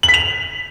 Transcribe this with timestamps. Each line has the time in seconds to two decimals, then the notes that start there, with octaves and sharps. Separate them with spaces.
0.03 F#7
0.09 B6
0.14 F7